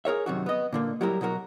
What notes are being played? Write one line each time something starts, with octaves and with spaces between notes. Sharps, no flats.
G#4 A#4 C#5 E5
F#2 C3 D#3 F#4
B3 D#5
A#2 D3 A#3
F#3 G3 E4 A#4
B2 F#3 F#4 A#4